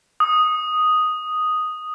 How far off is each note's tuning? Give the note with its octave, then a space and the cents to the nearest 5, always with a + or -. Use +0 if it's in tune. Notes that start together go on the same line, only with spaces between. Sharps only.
D#6 +0